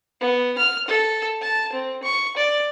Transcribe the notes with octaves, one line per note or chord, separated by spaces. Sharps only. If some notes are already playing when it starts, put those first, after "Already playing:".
B3
F6
A4
A5
C4
C#6
D5